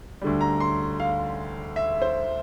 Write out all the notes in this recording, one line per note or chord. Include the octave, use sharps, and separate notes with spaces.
D2 D3 G3
A#5
C6
F5
E5
C5